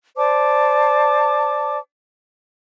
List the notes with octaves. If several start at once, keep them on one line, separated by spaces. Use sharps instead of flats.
C5 D5 A5 D6